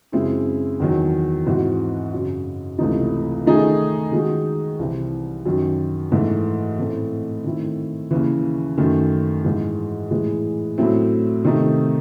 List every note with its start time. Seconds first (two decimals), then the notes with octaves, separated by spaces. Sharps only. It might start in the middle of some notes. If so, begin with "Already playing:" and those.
0.12 F#2 C#3 G#3 C4 E4
0.80 E2 D#3 F#3
1.46 G#2 E3 C4 F#4
2.13 F#2 C#3 F#3
2.79 C#2 C3 E3 A3 D#4
3.46 D#3 A3 D#4 G#4
4.12 D#3 G#3 D#4 F#4
4.79 C2 C3 E3 C4
5.45 F#2 D#3 F#3
6.12 G#2 E3 A3
6.79 A2 E3 A3 C4
7.44 D#3 A3 C4 E4
8.11 D#2 C#3 E3
8.78 F#2 D#3 A3
9.44 G#2 E3 G#3
10.11 A2 E3 G#3
10.78 A2 F#3 A3 C4 E4
11.45 C3 D#3 A3 D#4